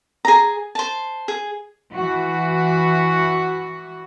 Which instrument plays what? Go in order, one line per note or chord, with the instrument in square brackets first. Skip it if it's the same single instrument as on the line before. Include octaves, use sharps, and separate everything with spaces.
[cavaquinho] G#4 A#5
C5 A5
G#4
[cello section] E3 F#4